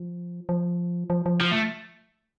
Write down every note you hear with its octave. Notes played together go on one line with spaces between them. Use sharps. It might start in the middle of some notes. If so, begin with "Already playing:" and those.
Already playing: F3
F3
F3
F3
F3
A3